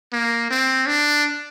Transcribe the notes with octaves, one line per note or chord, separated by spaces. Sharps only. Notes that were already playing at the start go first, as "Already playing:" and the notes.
A#3
C4
D4